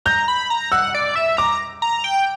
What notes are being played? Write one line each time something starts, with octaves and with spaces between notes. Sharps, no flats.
A#5 G6
B5
A#5
F#5 E6
D5
E5
A#5 D6
A#5
G5